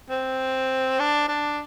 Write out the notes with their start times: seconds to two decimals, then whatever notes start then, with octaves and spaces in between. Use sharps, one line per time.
0.10 C4
0.99 D4
1.28 D4